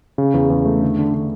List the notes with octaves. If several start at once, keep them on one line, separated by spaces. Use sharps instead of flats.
C#3
E2
E2
A3
D3
D3
D3